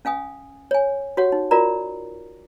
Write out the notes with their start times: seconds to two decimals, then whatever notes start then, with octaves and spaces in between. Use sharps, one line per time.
0.05 C#4 F5 G#5 D#6
0.71 C#5 G#5
1.17 F#4 G4 C#5 F#5
1.32 D#4
1.51 F4 F#4 A#4 D5 A#5